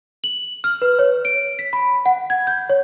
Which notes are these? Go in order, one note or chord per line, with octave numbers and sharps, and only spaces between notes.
F#7
F6
B4
C#5
D7
B6
B5
F#5
G#6
G6
C#5